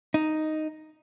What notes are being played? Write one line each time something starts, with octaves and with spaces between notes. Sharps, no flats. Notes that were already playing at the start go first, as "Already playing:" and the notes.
D#4